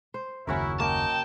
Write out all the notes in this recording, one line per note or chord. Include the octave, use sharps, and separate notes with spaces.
C5
F#1 D#2 C#3 C#4 E4 F#4 A#4
A#3 D#5 G5 A5